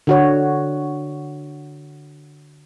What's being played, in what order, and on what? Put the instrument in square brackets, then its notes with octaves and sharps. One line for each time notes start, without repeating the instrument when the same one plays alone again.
[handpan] D3 F#4 C#5